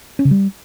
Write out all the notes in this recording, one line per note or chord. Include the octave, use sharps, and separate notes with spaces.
C#4
C#3
G3